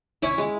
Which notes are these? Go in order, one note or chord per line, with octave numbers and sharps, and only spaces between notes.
C#4 E4
G#3